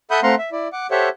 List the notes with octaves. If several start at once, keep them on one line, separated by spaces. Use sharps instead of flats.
A4 E5 F#5 B5 D#6 G6
A3 C4 F5 F#5 A#5 C6
E5
E4 D5
F#5 D6
G4 A4 C5 C#5 E5 F#5